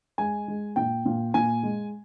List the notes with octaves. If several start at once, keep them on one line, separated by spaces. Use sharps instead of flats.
G#3 G#5
G#3
A#2 G5
A#2
A#2 G#5
G#3